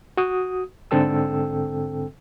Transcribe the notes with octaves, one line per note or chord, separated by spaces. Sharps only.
F#4 D#6
G#2 D3 C4 A4 G5 E6